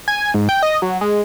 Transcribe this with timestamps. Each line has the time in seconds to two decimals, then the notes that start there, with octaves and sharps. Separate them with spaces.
0.08 G#5
0.34 G#2
0.49 G5
0.63 D#5
0.82 F#3
1.01 G#3